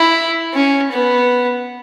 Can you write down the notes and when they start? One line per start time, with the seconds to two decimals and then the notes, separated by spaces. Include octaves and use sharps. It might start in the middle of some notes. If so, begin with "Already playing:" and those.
Already playing: E4
0.54 C#4
0.92 B3